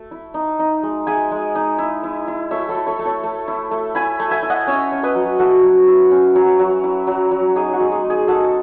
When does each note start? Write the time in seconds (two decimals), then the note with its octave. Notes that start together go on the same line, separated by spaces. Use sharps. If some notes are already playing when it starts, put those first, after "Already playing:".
Already playing: A3
0.11 E4
0.34 D#4
0.59 D#4
0.83 G#3
1.07 G#3 E5 G#5
1.31 G#3
1.55 D#4
1.78 E4
2.03 E4
2.28 E4
2.51 A3 C#5 E5
2.68 A4 C#5
2.75 A3
2.87 A4 C#5
2.99 A3
3.05 A4 C#5
3.23 A3
3.48 E4
3.71 A3
3.95 E4 G#5 B5
4.19 A3
4.31 E5 G#5
4.43 E4
4.50 D#5 F#5
4.67 C#4 C#5 E5
4.92 C#4
5.03 B4 D#5
5.15 F#3
5.39 E4 F#4 A4
5.63 F#3
5.87 E4
6.11 C#4
6.35 F#3
6.59 F#3
6.84 E4
7.07 F#3
7.31 F#3
7.56 D#4 G#4
7.73 F#4
7.80 G#3
7.92 G#4
8.04 D#4
8.10 G#4
8.27 G#3 F#4 A4